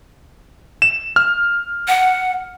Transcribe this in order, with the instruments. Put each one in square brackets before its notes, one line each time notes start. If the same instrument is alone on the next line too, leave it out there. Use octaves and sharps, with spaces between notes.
[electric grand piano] E7
F6
[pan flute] F#5